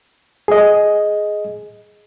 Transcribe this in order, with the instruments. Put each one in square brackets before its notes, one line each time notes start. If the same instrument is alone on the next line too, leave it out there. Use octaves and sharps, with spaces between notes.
[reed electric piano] G#4 D#5